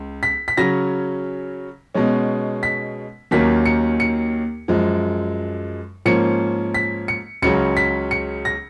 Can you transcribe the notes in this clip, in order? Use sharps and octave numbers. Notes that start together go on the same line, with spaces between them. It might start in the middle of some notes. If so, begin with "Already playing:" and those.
Already playing: C#2
B6
B6
C#3 F#3 C#4 A#6
B2 G#3 C#4
B6
D#2 D#3 F#3 A#3 C#4 B6
C#7
C#7
F#2 F3 G#3
G#2 F3 A#3 C#4 C#7
B6
C#7
C#2 C#3 F#3 C#4 C#7
B6
C#7
A#6